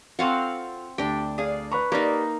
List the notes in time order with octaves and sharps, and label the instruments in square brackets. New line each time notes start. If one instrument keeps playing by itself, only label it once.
[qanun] C4 F5 F#5 [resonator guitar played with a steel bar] F4 F#4 A4
[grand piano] D2 [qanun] D4 G5 [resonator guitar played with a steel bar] G4
[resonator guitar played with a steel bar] G#4 D5 F5
[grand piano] B4 B5 C#6 [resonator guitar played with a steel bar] A#5
[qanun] A#3 D#4 [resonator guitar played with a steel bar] G4 A#4 D5